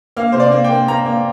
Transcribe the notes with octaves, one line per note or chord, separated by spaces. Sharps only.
A#3 F5
C3 C5
D5
A#3
G5
A#3
A#3 A#5
A#3